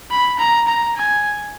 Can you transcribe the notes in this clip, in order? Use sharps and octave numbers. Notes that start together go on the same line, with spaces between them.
B5
A#5
A#5
G#5